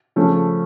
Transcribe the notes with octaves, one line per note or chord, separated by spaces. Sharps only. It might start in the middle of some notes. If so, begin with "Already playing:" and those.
C#3 F3 A3 C#4